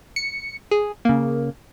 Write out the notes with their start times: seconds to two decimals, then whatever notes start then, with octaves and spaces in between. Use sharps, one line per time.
0.16 C#7
0.71 G#4
1.05 C#3 A#3